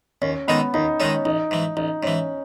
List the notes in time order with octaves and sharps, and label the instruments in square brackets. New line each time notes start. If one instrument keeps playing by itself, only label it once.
[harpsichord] D#2 [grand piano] C#4
[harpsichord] D#3 G#3 D#4 A4 [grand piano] B3
[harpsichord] D#2 [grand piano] D#4
[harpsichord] D#3 G#3 D#4 A4 [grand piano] C#4
[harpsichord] A1 [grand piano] D#4
[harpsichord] G#2 E3
[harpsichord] A1 [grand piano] D#4
[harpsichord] G#2 E3 [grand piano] C#4